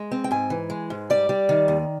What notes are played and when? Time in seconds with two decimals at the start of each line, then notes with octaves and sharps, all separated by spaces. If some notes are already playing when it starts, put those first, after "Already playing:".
Already playing: G#3
0.12 C4
0.24 G5
0.31 G#2 G#5
0.50 E3
0.70 G#3
0.90 G#2
1.10 G3 D5
1.29 G3
1.49 D#3
1.68 D#2